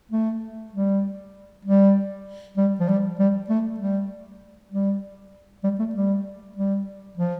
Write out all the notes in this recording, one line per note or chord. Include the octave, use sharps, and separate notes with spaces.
A3
G3
G3
G3
F3
G3
G3
A3
G3
G3
G3
A3
G3
G3
F3